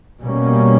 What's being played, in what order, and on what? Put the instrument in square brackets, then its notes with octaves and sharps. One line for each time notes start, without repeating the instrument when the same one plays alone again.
[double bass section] B2 G3 A#3 C#4